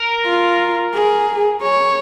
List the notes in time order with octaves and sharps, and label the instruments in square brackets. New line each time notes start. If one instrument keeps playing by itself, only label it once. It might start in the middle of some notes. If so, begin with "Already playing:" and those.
Already playing: [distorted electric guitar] A#4
[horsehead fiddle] F4
G#4
C#5